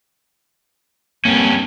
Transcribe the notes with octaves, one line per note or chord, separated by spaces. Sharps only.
G2 A#3 C4 C#4